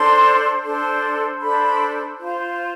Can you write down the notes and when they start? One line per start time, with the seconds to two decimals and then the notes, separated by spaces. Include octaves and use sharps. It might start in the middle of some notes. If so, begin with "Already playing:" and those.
Already playing: D4 A4 C5 C6
0.63 D4 A4 C5
1.40 D4 A4 C5 B5
2.17 F4 C5